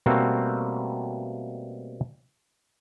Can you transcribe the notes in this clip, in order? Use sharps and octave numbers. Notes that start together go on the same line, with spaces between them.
B2 G3 A3 A#3 C4 F#4